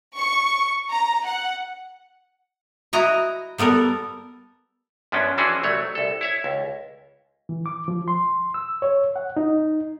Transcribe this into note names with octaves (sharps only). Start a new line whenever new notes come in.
C#6
A#5
F#5
E4 F#4 D#5 A#5
G3 B3 A4 A#4
F#2 F3 B3 C#4 D4
E3 F3 C#4 D4 F#4 G#4
C2 F#3 A3 C#5
C2 A4
E4 C#5 E5
C#2
E3
D6
F3
C6
E6
C#5
F#5
D#4